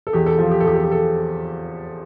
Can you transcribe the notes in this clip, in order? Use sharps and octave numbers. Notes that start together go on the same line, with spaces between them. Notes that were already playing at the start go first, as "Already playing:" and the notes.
A4
E2 G4
A4
F3
G4
A4
E2 G4
A4
G4
A4